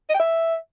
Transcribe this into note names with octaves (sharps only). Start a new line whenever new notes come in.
D#5
G5
E5